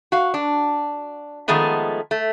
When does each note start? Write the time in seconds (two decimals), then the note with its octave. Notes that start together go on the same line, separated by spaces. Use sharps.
0.12 F#4 F5
0.34 D4
1.48 D#3 F3 G#3 A3 B3
2.11 A3